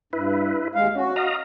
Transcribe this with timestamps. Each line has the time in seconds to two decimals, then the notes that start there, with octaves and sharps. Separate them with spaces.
0.13 G2 E4 B4
0.75 D#2 G#3 F5
0.95 C#4 F#4
1.16 D#5 F5 A#5